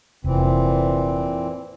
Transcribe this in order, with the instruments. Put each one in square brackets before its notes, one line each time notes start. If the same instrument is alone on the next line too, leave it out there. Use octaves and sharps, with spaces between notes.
[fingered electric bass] F1 [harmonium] A#2 E3 C4